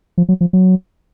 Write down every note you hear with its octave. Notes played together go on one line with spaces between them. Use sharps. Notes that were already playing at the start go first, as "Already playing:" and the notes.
F3
F#3
F3
F#3